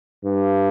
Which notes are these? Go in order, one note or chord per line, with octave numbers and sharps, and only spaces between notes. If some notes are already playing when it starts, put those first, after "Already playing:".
G2